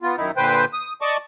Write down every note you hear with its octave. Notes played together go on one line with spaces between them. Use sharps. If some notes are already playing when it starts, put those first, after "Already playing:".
B3 F4
F#2 D#3 D#4 E4
A#2 D3 B4 C5 G5
D#6
D5 D#5 A5 C#6 D6